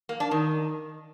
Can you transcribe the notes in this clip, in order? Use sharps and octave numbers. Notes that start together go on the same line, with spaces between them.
A#3
D4
D#3